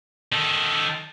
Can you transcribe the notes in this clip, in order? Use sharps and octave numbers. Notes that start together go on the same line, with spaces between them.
D#3 A4